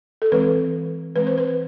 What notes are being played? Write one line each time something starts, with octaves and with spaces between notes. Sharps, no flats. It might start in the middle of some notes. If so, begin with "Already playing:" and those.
A4
E3 G#3 C4 B4
E3 G#3 C4 B4
C5
B4